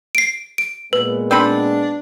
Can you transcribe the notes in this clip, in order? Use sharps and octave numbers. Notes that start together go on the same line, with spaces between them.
C7 D7
D7
A#2 G#3 B3 B4
C4 D4 D#4 B5